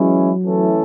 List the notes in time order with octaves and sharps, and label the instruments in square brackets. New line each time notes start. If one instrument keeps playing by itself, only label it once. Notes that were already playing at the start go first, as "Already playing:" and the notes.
Already playing: [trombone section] E3 G#3 C#4 E4 G#4 [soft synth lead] F#3
[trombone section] E3 A3 C#4 E4 A4